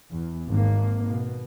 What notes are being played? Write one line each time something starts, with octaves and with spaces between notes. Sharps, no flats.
E2
G#1 G#2 A#3
B2